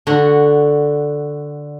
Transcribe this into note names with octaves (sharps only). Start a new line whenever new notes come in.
D3 F#4 F#5